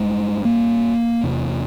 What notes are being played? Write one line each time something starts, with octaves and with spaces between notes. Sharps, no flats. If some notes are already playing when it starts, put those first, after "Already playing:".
Already playing: G2 G#3
A#3
E2 C3